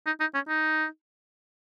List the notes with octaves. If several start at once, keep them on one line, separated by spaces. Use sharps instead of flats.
D#4
D#4
C#4
D#4